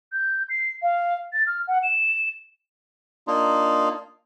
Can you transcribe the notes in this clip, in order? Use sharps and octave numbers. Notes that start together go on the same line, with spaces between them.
G6
C7
F5
A6
F6
F#5
E7
A#3 D4 D#4 F4